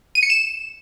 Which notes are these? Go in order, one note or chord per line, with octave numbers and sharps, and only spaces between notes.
D#7
C#7
E7